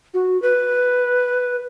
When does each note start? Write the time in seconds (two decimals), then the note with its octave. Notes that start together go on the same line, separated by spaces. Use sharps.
0.14 F#4
0.42 B4